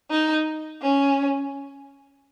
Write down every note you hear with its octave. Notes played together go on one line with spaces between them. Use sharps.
D#4
C#4